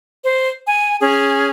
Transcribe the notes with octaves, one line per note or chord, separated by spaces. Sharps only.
C5
G#5
C#4 G#4